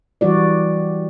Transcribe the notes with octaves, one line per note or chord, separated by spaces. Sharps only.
E3 G3 F#4 D5